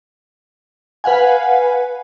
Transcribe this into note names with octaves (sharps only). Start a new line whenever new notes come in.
B4 F5 F#5 G#5